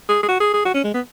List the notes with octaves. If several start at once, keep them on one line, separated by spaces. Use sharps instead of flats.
G#4
G#4
F#4
G#4
G#4
F#4
C#4
G#3
B3